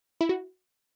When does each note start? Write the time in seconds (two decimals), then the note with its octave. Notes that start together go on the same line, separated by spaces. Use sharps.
0.21 E4
0.29 F#4